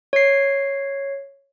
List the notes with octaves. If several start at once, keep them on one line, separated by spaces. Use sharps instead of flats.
C#5 C7